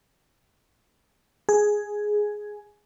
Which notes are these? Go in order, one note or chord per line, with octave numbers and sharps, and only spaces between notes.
G#4